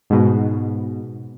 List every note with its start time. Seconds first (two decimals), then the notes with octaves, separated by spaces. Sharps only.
0.10 G#2 B2